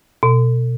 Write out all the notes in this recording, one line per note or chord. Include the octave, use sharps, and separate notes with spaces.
B2